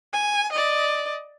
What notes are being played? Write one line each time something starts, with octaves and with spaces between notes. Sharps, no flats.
G#5
D5 D#5